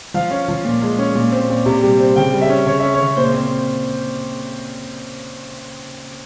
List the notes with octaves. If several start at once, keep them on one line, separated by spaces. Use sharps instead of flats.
F3 F5
C#4
F3
A#2
G#3
C#4
A#2
C4
A#2
C3
G3
C4
C#3 G5
G3
E5
C#4
C#3 C#5
C#4 E5
C#5
C#3
A#2 C5
C4